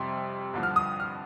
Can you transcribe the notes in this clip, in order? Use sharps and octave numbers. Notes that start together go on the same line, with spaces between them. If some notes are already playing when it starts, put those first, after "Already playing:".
Already playing: F2 C3 G3 C6
G2 D3 F3
F6
D#6
F6